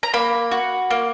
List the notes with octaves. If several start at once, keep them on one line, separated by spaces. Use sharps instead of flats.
A#5
A#3 B5
F#4
A#3